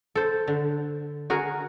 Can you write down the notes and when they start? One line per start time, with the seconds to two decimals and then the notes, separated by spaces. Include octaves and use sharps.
0.15 A4 C5
0.48 D3
1.30 F#4 G#4 A#4